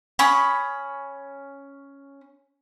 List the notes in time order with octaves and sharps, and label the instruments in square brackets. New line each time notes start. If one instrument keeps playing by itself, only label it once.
[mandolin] C#4 B5 D#6